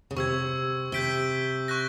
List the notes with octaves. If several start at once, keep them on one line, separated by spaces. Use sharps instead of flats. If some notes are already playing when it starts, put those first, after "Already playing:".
C#3
C3 C#6 E6 G#6
C3 G6 B6 D7 G7
C#6 F#6 A#6